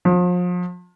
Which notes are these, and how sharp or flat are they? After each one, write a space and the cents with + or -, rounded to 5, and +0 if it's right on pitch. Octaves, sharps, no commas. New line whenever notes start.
F3 +35